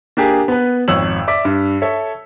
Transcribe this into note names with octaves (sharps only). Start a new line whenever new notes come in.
A#3 D4 G4 G#4
B3 B4
G#1 F2 C#5 E6 F#7
D5 E5 D6 B6
G2
A4 C#5 E5